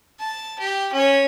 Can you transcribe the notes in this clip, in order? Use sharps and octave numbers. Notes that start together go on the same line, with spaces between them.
A5
G4
C#4 C#5